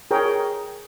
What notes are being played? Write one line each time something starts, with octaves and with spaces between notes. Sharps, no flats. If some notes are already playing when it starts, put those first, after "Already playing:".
G#4 A#4 C#5 G5